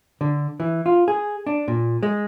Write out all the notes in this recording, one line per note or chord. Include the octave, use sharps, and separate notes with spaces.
D3
E3
F4
G#4
D4
A#2
G#3